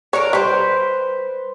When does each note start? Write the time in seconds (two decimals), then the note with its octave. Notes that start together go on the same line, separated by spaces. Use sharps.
0.13 D4 A4 A#4 C#5
0.33 G3 B4 C5